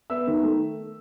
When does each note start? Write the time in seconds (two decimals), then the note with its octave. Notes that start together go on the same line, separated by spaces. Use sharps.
0.10 B3 E5 E6
0.27 D#3
0.43 A3